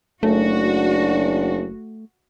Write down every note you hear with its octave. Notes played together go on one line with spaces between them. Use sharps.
F#1 A3 D4 F#4